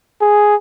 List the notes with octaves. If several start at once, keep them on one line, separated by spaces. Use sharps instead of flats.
G#4